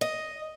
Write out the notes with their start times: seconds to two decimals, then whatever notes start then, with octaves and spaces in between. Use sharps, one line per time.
0.01 D#5